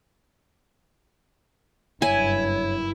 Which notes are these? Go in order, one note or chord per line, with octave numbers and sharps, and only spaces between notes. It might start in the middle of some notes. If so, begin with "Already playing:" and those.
F#1 G2 E4 C#5 G#5